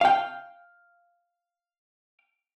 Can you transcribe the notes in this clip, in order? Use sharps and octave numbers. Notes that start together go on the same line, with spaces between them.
F5 G5